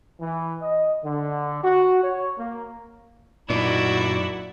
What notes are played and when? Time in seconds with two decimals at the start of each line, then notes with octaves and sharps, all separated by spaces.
0.21 E3
0.62 D#5
1.04 D3
1.64 F#4
2.04 C#5
2.38 A#3
3.50 F#2 A#2 D#4 E4 F#4 D5